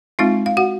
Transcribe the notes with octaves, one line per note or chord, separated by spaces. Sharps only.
G#3 C4 D#4 F4 F5
F5
F#4 F#5